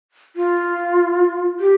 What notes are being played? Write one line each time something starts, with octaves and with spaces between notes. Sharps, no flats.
F4
G4